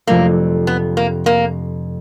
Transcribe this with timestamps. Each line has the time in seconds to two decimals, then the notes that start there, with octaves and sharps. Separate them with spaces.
0.07 F2 C3 F3 A3 A#3 D4
0.67 B3
0.97 A#3
1.26 A#3